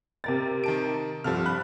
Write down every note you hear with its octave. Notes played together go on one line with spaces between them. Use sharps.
C3 A#4 A6
D#3 A5 D7
C2 G2 F3 A4 F6
B5 F#6